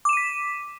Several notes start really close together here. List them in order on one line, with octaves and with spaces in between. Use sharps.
D6 E7 D#7 B6